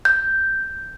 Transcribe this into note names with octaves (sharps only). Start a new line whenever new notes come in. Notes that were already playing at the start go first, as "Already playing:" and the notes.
G6